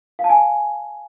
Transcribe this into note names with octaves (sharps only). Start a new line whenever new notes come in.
F5
A5
G#5